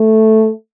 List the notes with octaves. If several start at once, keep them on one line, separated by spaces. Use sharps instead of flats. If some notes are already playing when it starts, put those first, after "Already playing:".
Already playing: A3